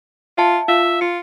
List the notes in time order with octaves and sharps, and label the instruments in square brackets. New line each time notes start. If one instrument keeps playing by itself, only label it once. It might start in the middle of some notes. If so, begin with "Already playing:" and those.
[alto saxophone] F4 [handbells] E5 A5
[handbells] F4 F5 [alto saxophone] E5
[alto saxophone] F4 [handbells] C#7